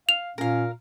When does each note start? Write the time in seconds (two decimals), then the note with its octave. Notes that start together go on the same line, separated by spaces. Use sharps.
0.09 F5 F7
0.38 A#2 C#4 A#4 F5